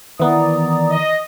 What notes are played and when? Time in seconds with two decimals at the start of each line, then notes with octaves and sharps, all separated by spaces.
0.20 D#3 E3 B3 D5 A#5 D#6
0.89 D#5